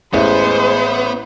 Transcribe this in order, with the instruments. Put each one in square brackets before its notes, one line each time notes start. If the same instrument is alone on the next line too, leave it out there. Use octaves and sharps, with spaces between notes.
[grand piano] A1 [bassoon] G#3 [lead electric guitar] B3 [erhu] C5